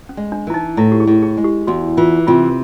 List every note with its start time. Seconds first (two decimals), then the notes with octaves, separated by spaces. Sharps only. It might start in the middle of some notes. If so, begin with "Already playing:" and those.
0.09 C#4
0.17 G#3
0.32 D4
0.47 E3 E4
0.54 D#4
0.77 A2 E4
0.92 G4
1.00 G#4
1.07 A2
1.23 G#4
1.37 G#3
1.44 G4
1.67 E2 F#4
1.97 E3 F4
2.27 C3 F4